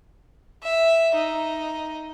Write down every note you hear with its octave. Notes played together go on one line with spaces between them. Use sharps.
E5
D#4